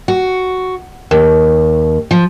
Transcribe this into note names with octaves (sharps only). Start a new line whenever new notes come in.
F#4
D#2
F3